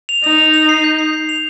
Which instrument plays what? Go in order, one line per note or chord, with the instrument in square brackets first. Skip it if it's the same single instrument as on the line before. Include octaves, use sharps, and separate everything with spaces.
[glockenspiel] F7
[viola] D#4 [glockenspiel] F7
[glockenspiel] F7
F7
C7
G6
C7
C7
F7